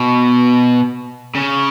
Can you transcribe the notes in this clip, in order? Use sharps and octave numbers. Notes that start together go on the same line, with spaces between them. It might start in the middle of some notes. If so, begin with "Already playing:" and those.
Already playing: B2
C#3